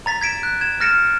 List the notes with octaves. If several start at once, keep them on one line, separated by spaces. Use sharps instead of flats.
A#5 A6 B6
G#6 B6 D7 E7
F#6
G#6 E7
F6 A6 A#6 C#7 D7 E7